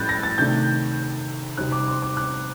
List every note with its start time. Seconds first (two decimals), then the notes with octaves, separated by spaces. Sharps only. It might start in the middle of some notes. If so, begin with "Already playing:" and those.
Already playing: A2 G3 F#6 G6 A6
0.09 A#6
0.23 A6
0.38 C3 D#3 A3 D4 G6
1.57 C3 G3 C4 D#4 F#6
1.72 D6
1.88 C6
2.02 D6
2.17 F#6